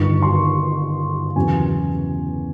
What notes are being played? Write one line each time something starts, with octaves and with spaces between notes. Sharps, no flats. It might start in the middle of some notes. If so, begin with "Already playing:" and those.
Already playing: G1 G2 D#3 C#6
C6
E2 C#3 F#3 B3 G#5